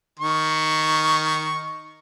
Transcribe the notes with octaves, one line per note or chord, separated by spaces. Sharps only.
D#3 C#6